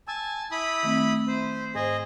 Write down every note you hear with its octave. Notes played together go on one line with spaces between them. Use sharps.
G#5 A5 E6
E4 B5 D#6
D#3 A3 C4
C5
G#2 G#4 C5 D#5